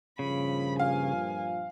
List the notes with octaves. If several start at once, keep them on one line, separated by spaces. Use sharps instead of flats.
G2 A#2 C#3 F3 B5
F5 G#5